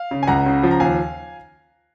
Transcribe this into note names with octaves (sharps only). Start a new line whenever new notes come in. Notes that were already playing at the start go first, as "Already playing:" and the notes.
Already playing: F5
C#3
G#5
C#2 F#5 A#5
C#3
F3
A#5
D#2 F5 G#5